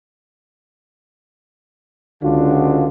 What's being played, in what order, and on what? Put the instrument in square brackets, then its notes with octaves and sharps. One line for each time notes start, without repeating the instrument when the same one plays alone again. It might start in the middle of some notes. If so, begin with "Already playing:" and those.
[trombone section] C#2 D3 D4 F4 F#4